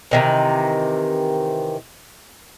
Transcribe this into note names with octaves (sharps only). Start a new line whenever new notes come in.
C3 D#3 E3